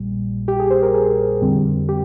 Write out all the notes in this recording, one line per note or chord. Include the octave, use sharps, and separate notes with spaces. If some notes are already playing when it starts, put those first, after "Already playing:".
Already playing: A#1 A#2 G3
G4
G#4
C5
A#4
G#4
F2 D3 G3 C4
G4